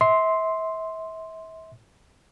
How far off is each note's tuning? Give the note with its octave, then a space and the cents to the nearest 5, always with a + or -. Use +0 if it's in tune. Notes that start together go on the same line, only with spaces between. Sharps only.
E5 -35 C6 +0